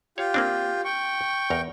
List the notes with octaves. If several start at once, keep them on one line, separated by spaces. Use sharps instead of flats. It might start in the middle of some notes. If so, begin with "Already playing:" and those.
F4 G4 C#5 F5
A#3 C4 D4
G5 C#6
E2 A#4